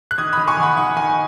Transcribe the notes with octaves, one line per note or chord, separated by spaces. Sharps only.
F#6
D#3 D#6 G#6
D#3 B5 D#6
G#5 C#6
D#3
F#5 B5
D#3 F#5
D#3 G#5